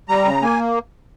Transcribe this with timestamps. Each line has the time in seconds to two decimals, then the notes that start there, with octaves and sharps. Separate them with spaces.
0.08 G3 A#5
0.25 C#3
0.42 A#3 G#5